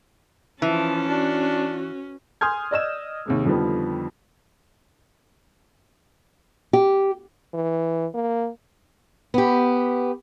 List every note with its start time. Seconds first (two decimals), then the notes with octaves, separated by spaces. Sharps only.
0.62 E3 F3 C#4 A5
1.09 D4 F#4
2.41 G#5 C6 D#6 F6 G6 G#6
2.71 D5 D#5 E6 E7
3.26 D#2 C3 G#3
3.45 F2 D3 D#3 F3 G3 B3
6.73 G4
7.54 E3
8.14 A#3
9.34 B3 G4